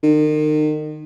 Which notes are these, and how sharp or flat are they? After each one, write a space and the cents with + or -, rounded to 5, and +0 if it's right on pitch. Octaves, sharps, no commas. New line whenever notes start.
D#3 -35